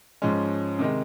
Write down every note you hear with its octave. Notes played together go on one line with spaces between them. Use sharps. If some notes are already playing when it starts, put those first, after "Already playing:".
G#2 F3 G#3 C#4
C3 D#3 G#3